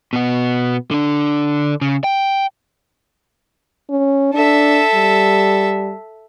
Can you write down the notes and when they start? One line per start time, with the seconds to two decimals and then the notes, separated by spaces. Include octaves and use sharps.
0.13 B2 B3
0.91 D3 D4
1.81 C#3
2.04 G5
3.90 C#4
4.34 D4 A4 E5
4.95 G3